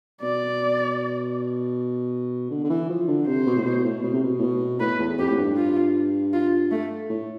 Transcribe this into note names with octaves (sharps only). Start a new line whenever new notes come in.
B2 D5
D3
D3
E3
F3
D3
C3 C5
B2
A2
B2
A2
B2
C3
B2
A2
B2
A2 B4
E2
F2 G4
A2
G2
F4
F4
A3
A2